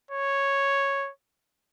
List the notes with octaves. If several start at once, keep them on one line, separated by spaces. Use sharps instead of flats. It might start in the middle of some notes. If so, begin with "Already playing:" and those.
C#5